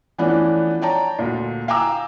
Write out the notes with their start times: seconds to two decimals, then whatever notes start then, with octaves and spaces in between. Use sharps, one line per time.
0.18 E3 F3 A3 B3 C#4 D4
0.81 C#5 D5 G5 A5 A#5
1.19 D2 A#2
1.68 F5 G5 G#5 A#5 D6 E6